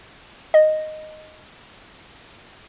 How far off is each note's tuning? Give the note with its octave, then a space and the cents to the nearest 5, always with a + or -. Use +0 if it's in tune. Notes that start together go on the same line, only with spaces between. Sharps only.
D#5 -5